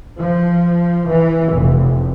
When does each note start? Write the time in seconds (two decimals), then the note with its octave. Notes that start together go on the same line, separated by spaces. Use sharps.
0.17 F3
1.07 E3
1.53 F1